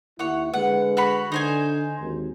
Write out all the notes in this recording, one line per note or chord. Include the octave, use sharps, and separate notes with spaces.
D#2 E4 C#5 F#5
D3 G#3 B4 F#5
F#4 C#5 B5
D3 D#4 C5 G#5
G#1 D#2